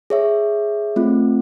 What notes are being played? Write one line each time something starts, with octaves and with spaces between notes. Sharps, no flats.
G#4 C#5 E5
A3 C4 F4